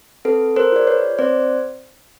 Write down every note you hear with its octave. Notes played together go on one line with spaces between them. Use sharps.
C4 A4 B4
A#4 C5
F4 G#4 D5
B4 C#5
C4 C5 D5